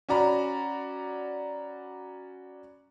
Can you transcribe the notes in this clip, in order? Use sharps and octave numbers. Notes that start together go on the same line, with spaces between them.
C#4 F#4 D5 A#5 B5